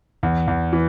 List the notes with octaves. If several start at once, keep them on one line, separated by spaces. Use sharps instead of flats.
E2
E2
E3